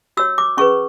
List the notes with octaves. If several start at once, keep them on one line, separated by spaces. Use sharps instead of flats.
F#4 C#5 E6
D6
C#4 G#4 B4 C#6